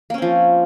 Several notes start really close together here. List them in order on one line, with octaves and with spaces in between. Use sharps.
A#3 C#4 C4 F3